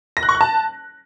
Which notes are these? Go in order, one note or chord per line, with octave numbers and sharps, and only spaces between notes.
A#6
F#6
C#6
F#6
A5